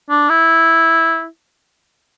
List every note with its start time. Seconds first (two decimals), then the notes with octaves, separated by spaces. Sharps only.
0.10 D4
0.29 E4